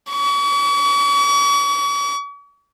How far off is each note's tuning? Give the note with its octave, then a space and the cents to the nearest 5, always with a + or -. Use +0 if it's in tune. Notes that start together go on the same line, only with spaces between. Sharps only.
C#6 +45